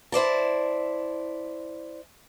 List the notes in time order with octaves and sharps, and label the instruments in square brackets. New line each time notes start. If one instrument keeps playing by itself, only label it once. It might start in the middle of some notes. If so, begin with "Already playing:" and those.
[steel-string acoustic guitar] E4 C5 D5 A5